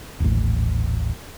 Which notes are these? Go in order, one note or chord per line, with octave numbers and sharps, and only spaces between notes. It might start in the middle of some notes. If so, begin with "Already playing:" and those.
D#1 A1